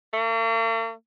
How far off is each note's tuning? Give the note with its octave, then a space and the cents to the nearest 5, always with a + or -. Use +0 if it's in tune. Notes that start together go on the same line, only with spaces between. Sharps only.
A#3 -45